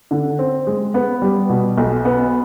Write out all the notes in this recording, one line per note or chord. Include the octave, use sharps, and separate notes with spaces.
D3
C4
G#3
B3
G3
B2
B1
B3